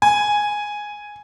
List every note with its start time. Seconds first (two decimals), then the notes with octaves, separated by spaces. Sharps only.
0.02 G#5